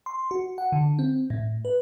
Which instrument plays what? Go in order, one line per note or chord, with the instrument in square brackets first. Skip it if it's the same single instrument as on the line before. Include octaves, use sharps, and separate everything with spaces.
[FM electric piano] C6
F#4
F#5
D3
C4
A2
B4